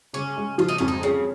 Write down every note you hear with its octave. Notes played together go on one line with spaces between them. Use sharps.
C#3 C#4
G#3
F3 F4
D#4
F2 C#4
D#4
C#3 C#4